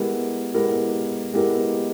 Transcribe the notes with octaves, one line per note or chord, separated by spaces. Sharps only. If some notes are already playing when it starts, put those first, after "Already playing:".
Already playing: G#3 B3 E4 G4 A#4
G#3 B3 E4 G4 A#4
G#3 B3 E4 G4 A#4